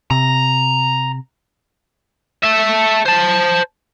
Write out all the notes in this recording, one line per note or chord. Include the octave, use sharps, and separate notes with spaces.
C3 A#5
A4 E5
C5 A5